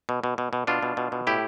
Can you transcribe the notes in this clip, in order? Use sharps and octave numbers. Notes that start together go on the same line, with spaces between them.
B2
B2
B2
B2
B2 D4 F4
B2
B2
B2
A2 E4 G4